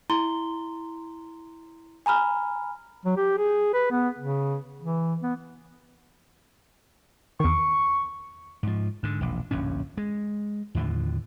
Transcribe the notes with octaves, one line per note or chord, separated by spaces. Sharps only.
E4 A#5 C6 G7
G#5 A#5 B5 F6
F#3
G4
G#4
B4
B3
C#3
E3
B3
E2 D#3 C#6
G#2 F3
G#2 D3
E1 A#1
D1 A#1 F#2 C#4
G#3
D#2 A2 D3 F3